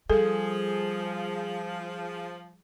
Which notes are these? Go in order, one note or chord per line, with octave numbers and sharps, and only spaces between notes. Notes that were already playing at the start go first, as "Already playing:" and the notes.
F3 G3 G#4 A4